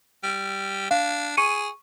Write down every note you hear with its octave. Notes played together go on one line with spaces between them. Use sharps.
G3
D4 F5
G#4 C#6 C#7 D#7